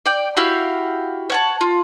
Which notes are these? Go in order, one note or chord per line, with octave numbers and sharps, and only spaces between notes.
D5 G5
E4 F#4 G4 F5
C#5 F#5 A5
F4